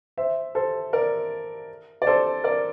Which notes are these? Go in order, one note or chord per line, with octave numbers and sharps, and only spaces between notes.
C5 E5
A4 C5
A#4 D5
D5
A4 C5
A#4 D5